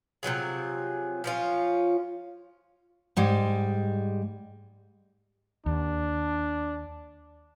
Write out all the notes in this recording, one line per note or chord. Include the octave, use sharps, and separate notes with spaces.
C3 F3 F#3 G#4
F3 C#4 F4
G#2 G3 G#3
D#2 D4